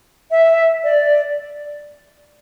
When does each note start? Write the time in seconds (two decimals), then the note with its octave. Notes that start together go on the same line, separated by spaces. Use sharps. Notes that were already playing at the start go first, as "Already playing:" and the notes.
0.31 E5
0.84 D5